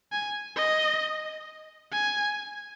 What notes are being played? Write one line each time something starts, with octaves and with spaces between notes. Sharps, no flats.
G#5
D#5
G#5